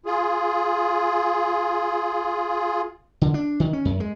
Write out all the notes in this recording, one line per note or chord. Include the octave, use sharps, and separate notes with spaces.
F4 G#4
D3
D4
D#3
C#4
F#2
G#3